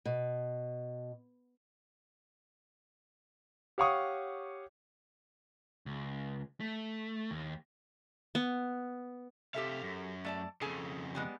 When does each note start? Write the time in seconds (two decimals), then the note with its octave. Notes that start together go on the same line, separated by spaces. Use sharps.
0.05 B2
3.78 G4 C#5 F5 F#5 C#6 D#6
5.86 C#2
6.60 A3
7.31 D#2
8.35 B3
9.54 C3 G4 A4 E5 F5
9.83 F#2
10.25 A3 D5 A5
10.61 F2 C#3 G#4 A4 G#5
11.15 G3 G#3 B3